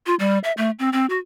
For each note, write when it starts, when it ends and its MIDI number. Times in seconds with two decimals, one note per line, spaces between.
0.06 0.15 65
0.19 0.38 55
0.44 0.52 76
0.57 0.71 57
0.79 0.90 60
0.93 1.06 60
1.10 1.18 66